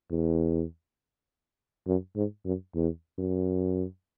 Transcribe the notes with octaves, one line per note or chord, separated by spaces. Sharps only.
E2
F#2
G#2
F#2
E2
F#2